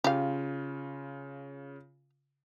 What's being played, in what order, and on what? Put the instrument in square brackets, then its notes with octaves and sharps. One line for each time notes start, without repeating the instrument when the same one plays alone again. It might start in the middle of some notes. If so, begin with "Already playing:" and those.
[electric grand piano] C#3 F4 [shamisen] G4 F5